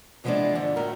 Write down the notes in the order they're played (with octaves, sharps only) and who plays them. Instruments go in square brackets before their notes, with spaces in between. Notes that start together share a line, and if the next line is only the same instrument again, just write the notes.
[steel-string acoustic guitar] C3 E3 F3 G#3 B3 D4
G2 D3 F3
A2 F#4 A#4